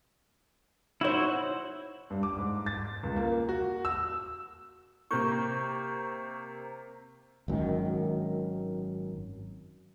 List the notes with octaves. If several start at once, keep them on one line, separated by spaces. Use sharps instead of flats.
D#4 E4 F#4 C5 C#5
G2
D6
G#2
A6
C#2
A#3
F#4
E6
C3 A#3 C#6 G6
G#1 F#2 A#2 D#3